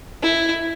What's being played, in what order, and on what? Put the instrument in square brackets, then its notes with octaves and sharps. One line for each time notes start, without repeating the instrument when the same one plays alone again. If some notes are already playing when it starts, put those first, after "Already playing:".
[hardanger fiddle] E4